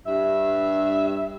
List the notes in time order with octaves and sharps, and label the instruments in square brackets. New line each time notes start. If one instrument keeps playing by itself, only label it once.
[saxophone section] G2 E5